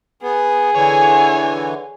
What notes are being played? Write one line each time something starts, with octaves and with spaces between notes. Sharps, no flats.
B3 G#4
D3 E3 C#5 G#5